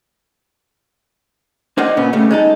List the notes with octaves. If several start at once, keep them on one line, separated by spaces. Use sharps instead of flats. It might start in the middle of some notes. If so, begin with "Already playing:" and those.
D4 A#4 C5 D#5 F#5
A#2 C#3 B3 C#4
C#3 G3 A3
G#3 D#4 A4